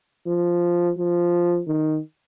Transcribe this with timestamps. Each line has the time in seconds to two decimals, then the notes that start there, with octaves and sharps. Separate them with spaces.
0.27 F3
0.97 F3
1.68 D#3